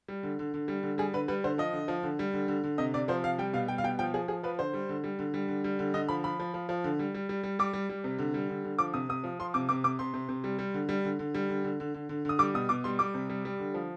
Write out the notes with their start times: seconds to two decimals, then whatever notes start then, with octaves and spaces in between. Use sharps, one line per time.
0.08 G3
0.23 D3
0.39 D3
0.54 D3
0.68 G3
0.83 D3
0.98 G3 G#4
1.13 D3 B4
1.28 G3 B4
1.44 D3 C5
1.58 F3 D#5
1.73 D3
1.88 F3
2.03 D3
2.19 G3
2.33 D3
2.48 D3
2.64 D3
2.78 C3 D#5
2.94 C3 D5
3.08 F3 C5
3.24 C3 F5
3.39 G3 G5
3.53 B2 F5
3.68 G3 G5
3.78 F5
3.84 B2 G5
3.99 F3 G5
4.14 F3 G#4
4.28 F3 G#4
4.43 F3 B4
4.59 D3 C5
4.73 G3
4.89 D3
5.04 G3
5.19 D3
5.34 G3
5.48 D3
5.64 G3
5.79 D3
5.94 D3 D#5
6.09 F3 B5
6.24 F3 B5
6.39 F3
6.54 F3
6.69 F3
6.84 D3
6.99 G3
7.14 G3
7.29 G3
7.44 G3
7.59 G3 D6
7.73 G3
7.89 G3
8.04 C3
8.18 D3
8.34 G3
8.49 D3
8.64 D3
8.79 F3 D6
8.94 C3 D#6
9.09 C3 D#6
9.24 F3
9.39 F3 C6
9.54 C3 D6
9.69 C3 D6
9.84 C3 D6
9.99 C3 C6
10.14 C3
10.29 C3
10.44 G3
10.59 G3
10.74 D3
10.89 G3
11.05 D3
11.19 D3
11.35 G3
11.49 D3
11.64 D3
11.80 D3
11.94 D3
12.09 D3
12.25 D3 D#6
12.39 G3 D6
12.54 B2 D#6
12.69 B2 D6
12.84 G3 C6
12.99 G3 D6
13.14 C3
13.30 G3
13.45 G3
13.59 D3
13.74 F3